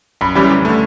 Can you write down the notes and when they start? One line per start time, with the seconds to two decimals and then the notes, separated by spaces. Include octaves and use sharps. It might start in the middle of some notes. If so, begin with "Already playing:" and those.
0.21 F#2 B5
0.35 E3 G3 C#4 G4 B5
0.50 D2
0.65 D3 A3